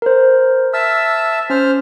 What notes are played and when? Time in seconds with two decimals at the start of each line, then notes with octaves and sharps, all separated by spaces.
0.02 A#4 C5
0.74 E5 A5 E6 F6
1.50 C#4 C5 F6